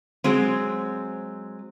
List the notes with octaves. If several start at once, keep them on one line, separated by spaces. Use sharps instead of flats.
F#3 G#3 C4